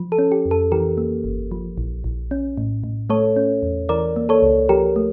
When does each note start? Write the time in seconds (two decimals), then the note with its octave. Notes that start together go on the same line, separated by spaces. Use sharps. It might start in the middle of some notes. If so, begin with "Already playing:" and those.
Already playing: F3
0.12 A4
0.19 C#4
0.32 G4
0.46 F2
0.51 A4
0.72 E3 G4 A#4
0.98 A#3
1.24 G1
1.51 F3
1.78 A#1
2.04 A#1
2.31 C#4
2.58 A2
2.84 A2
3.10 A3 A4 C#5
3.36 C#4
3.63 E2
3.89 E3 A#4 D5
4.16 A#3
4.29 A4 C#5
4.43 C#2
4.69 F3 G4 A#4
4.96 A3